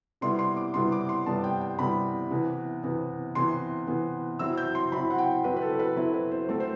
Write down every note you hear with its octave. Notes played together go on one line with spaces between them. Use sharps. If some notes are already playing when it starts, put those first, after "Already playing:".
C3 G3 B3 E4 C6
C6
D6
C3 G3 B3 E4 C6
D6
C6
C3 G3 B3 E4 A5
G5
G5
C3 G3 B3 E4 B5
C3 E3 B3
C3 E3 B3
C3 E3 B3 C6
C3 E3 B3
F#3 C4 E4 E6
G6
C6
F#3 C4 E4 B5
F#5
G5
F#3 C4 E4 B4
B4
A4
A4
B4
F#3 C4 E4
B4
C5
F#3 A3 C4 A4
C5